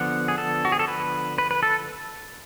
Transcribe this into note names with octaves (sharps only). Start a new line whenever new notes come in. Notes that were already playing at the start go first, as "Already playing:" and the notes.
Already playing: D3 F3 B3 F#5
G#4
A4
F#4
G#4
A4
B4
B4
B4
A4